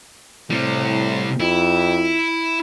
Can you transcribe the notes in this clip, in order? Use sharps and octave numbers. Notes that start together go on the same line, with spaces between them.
A2 C3 G3
F2 E4